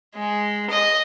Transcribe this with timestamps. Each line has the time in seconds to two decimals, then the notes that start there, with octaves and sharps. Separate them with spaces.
0.15 G#3
0.70 D#5